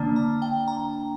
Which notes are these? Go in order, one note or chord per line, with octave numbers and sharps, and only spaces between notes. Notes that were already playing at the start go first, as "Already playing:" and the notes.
Already playing: D3 A#3 D4
A#5
G5
A#5